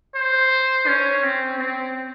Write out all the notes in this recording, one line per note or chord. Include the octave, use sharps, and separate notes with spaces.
C5
C#4
C4
C4